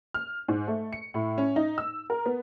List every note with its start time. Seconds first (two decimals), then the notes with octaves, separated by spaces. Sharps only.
0.14 F6
0.48 G#2
0.67 A3
0.93 C#7
1.14 A2
1.38 C#4
1.56 D#4
1.78 E6
2.10 A#4
2.26 B3